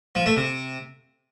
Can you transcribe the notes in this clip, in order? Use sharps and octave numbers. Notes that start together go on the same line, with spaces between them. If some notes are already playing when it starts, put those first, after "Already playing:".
F3
A3
C3